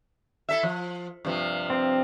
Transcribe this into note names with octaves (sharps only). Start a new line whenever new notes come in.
E4 A4 E5
F3
G2 C3 F3
C4